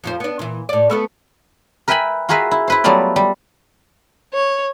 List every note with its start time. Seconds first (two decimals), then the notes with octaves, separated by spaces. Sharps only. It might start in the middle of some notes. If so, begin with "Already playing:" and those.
0.04 F2 F3 C5
0.20 B3 D4
0.39 A#2 E3
0.69 A2 D5
0.90 A3 B3 A4
1.88 A#4 B4 E5 G5 G#5 B5
2.29 F4 F#4 G#4 A#4 B4 E5
2.51 E4
2.67 E4 B4 C5
2.84 F#3 G3 A3 B3 F4 D5
3.16 G3
4.34 C#5